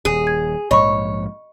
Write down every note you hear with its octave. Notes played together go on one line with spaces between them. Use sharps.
D#1 G#4
G#6
A#1 G#2 F3 C#5 D#5 B5 C#6